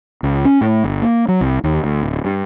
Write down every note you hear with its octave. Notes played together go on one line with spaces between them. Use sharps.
C#2
C#4
A2
G1
A#3
F#3
C2
D#2
D2
D1
G2